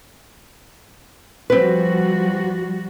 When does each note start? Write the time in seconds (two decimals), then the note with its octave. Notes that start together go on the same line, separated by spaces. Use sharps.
1.50 F3 G3 C4 F#4 B4